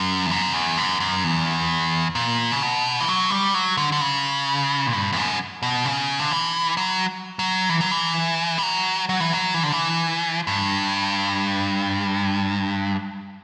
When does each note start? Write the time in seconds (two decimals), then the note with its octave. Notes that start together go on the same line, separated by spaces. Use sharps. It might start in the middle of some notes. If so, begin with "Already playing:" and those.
Already playing: F#2
0.26 E2
0.31 F#2
0.54 E2
0.77 F#2
1.00 F#2
1.24 E2
2.15 A#2
2.52 C#3
2.63 B2
3.00 E3
3.08 F#3
3.31 G3
3.54 F#3
3.77 D3
3.92 D3
4.01 C#3
4.87 A#2
4.93 G2
5.12 E2
5.16 F#2
5.62 B2
5.85 C#3
6.19 D3
6.31 E3
6.77 F#3
7.39 F#3
7.69 E3
7.81 F#3
7.91 E3
8.58 G3
8.63 F#3
9.09 F#3
9.20 E3
9.33 F#3
9.54 E3
9.63 D3
9.72 E3
10.47 G2